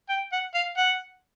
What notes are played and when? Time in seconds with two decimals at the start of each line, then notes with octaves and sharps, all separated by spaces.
0.09 G5
0.32 F#5
0.55 F5
0.77 F#5